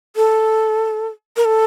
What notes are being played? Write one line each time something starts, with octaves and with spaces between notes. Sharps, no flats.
A4
A#4
A4